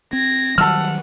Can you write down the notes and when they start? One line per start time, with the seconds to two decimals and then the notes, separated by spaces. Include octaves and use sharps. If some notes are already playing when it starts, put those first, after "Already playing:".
0.13 C4 G#6 A#6
0.58 D#3 F#3 G3 F#5 A5 E6 F6